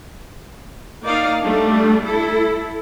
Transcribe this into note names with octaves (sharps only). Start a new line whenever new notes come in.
A#3 D#4 D5 F5
G3 A3 D4
E4 A4